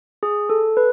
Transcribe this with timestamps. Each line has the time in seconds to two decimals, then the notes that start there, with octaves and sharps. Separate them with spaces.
0.23 G#4
0.49 A4
0.77 B4